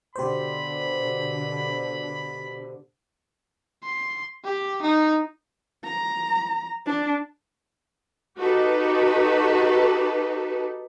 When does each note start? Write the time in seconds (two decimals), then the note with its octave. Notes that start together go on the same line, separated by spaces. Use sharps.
0.16 B2 D3 G4 C5 B5
3.83 C6
4.45 G4
4.82 D#4
5.85 A#5
6.86 D4
8.37 D#4 F#4 G4 A4 B4